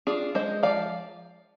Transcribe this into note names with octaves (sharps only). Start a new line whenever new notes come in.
D4 F4 G#4
G#3 C5 D#5
F3 D5 F5